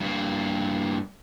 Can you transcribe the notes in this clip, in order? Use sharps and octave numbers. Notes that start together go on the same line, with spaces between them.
G2 A#3